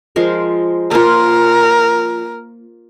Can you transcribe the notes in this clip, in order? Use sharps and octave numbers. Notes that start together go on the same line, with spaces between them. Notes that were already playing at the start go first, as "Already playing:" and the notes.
F3 G#3 A#4
A#3 F4 A#4